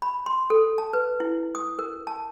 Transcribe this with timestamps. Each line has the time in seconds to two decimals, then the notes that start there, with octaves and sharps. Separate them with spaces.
0.02 B5
0.26 C6
0.50 A4
0.78 A5
0.93 B4
1.20 E4
1.55 D#6
1.79 A#4
2.07 A5